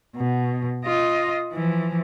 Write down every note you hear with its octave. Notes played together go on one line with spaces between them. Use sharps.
B2
F4 D#5
E3 F3